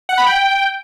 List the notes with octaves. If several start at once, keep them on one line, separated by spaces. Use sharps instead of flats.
F#5
B5
G5